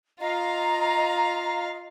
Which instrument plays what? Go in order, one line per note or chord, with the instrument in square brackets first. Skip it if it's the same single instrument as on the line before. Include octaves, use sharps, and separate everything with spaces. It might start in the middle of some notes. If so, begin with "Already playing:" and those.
[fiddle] F4 F5 [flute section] D#5 A#5